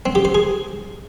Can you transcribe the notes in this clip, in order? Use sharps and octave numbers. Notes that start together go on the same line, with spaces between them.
C4
G4
C5
G#4